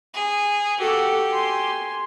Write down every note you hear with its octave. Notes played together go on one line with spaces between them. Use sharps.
G#4
F#4 G4 A4
G#5 C6